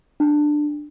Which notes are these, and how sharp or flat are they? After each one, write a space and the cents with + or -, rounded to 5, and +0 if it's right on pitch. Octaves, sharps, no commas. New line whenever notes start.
D4 +15